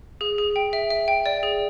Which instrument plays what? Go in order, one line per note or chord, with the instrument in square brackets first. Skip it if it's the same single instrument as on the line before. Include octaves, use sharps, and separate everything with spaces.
[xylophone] G#4
G#4
G5
E5
E5
G5
D5
G#4